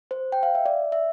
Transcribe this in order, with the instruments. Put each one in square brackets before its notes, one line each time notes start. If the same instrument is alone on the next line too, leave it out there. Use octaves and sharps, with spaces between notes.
[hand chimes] C5
G5
F5
E5
D5
E5